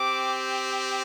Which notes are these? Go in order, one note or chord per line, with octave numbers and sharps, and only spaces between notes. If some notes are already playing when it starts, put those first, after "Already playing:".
Already playing: C4 G4 D6